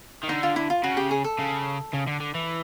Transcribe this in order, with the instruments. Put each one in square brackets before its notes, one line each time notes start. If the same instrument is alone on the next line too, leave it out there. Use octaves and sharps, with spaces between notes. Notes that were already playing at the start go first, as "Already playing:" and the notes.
[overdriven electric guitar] D#3
[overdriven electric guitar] D3 [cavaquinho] D#4
[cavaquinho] F4
E4
F4
[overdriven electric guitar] C#3 [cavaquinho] F#4
[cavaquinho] G4
G#4
A4
[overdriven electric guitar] C#3
C#3
D3
D3
E3